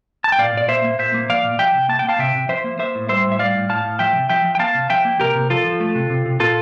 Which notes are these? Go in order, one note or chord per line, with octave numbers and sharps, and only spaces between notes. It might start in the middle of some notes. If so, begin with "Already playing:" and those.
A5
G5
A#2 D5 F5
A#2 D5
A#3 C5 E5
A#3
A#2 C5 E5
A#3
F3 D5 F5
A#2
F3 E5 G5
C3
A#3 A5
G5
A#3 F5 A5
C3 E5 G5
C3
F3 C5 E5
A#3
A#3 C5 E5
A2
G3 C5 E5
A2
E5
G3 D5 F5
A2
A2 F5 A5
A2
F3 E5 G5
C3
F3 E5 G5
F3
G5
A#3 F5 A5
C3
F3 E5 G5
A#3
C3 G4 A#4
C3
F3 F4 A4
F3
A3
C3
C3
C3
A#2 F4 A4